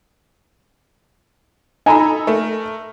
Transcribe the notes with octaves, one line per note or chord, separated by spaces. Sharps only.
D#4 A4 G#5 A#5 B5
A3 A#4